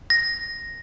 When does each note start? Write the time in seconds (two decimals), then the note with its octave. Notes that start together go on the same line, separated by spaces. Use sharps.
0.10 A#6